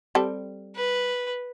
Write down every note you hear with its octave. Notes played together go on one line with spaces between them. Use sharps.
G3 C4 A4
B4